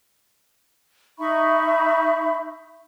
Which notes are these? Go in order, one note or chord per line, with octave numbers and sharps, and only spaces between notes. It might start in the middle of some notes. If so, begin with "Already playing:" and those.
D#4 E5 B5 C#6